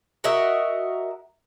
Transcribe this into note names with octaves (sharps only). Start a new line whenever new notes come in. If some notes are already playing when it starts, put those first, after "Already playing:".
F#4 A#4 D#5 E5